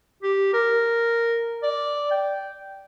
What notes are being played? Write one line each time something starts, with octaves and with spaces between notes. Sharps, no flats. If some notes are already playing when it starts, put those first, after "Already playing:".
G4
A#4
D5
G5